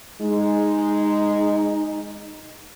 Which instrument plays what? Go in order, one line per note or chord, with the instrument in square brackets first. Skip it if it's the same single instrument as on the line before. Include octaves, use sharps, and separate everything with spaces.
[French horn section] G#3 [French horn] D#4